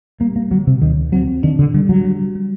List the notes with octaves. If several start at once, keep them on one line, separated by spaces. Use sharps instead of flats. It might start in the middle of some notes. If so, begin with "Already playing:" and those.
G3 A#3
A#3
D3 F#3
C3
D2 D#3
F#3 C4
D#3 D4
D3
D3 G3
F#3
G3
G3